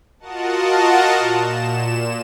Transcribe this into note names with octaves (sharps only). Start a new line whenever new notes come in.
F4 F#4 A#4 D#5 F#5 A5
A#2 E7